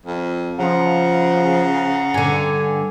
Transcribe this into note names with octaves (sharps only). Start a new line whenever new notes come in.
F2
C#3 F3 F#5 A#5
G2 D3 G#5